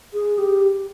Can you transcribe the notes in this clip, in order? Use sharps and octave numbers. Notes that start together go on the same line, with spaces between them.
G#4
G4